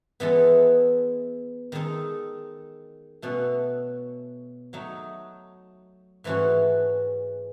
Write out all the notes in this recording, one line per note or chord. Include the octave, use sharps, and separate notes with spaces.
E3 G#3 B3 E4 A4
D#3 G#3 D#4 A4
B2 A3 C#4 F#4 A4
F#3 A3 D#4
G#2 E3 A3 C#4 F#4